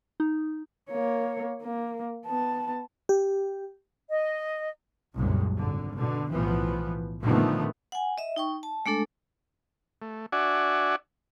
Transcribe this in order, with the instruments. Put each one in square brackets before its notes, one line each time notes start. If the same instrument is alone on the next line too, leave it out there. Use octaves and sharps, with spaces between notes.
[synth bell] D#4
[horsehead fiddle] A#3 C#5
A#3
B3 A5
[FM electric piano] G4
[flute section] D#5
[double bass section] F#1 C2 F#2 A#2 F#3 G#3
G#1 D3
B2 D3
B1 A2 E3 F3 B3
A#2 D3 D#3 F3 A3 B3
[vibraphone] F#5 G#5
D#5 E5
D#4 G5 C#6
A5
G#3 A3 D4 A4
[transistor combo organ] A3
D4 F#4 D5 E5 F#5 G#5